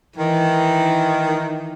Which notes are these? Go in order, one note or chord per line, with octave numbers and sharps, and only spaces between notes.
D#3 E3